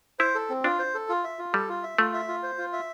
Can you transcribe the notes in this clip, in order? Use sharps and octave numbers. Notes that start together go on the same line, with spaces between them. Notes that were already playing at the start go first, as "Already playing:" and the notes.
E4 C5
A4
C4
D4 F4
C5
A4
F4
E5
F4
G3 A4
F4
E5
A3 F4
E5
F4
C5
F4
E5